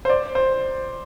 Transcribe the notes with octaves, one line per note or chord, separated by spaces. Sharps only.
C5
D5
C5